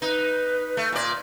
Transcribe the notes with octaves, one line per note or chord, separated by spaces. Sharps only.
D#4 B4
A3
A#2 D5